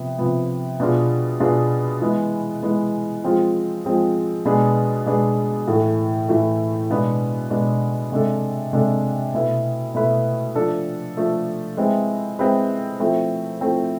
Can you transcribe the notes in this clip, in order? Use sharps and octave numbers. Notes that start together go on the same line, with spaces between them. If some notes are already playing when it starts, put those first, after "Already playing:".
Already playing: C3 F3 B3
C3 F3 B3
B2 B3 D4 F4 G#4
B2 B3 D4 F4 G#4
E3 G#3 B3
E3 G#3 B3
F3 G#3 C4 F4 G#4
F3 G#3 C4 F4 G#4
B2 G#3 B3 D4 G#4
B2 G#3 B3 D4 G#4
A2 E3 A3
A2 E3 A3
B2 G#3 B3 D4
B2 G#3 B3 D4
C3 G#3 D4 A4
C3 G#3 D4 A4
B2 A3 E4 B4
B2 A3 E4 B4
F3 A3 D4 A4
F3 A3 D4 A4
G#3 C4 E4 G#4 B4
G#3 C4 E4 G#4 B4
F3 A3 C4 E4
F3 A3 C4 E4